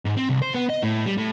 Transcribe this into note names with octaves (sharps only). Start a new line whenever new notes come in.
G#2
C4
C2
C5
B3
D#5
A2
G3
A2